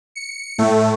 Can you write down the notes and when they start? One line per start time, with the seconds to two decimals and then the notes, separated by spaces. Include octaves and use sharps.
0.15 C#7
0.58 A2 A3